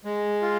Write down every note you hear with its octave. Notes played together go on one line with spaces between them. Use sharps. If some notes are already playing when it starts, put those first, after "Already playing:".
G#3
F4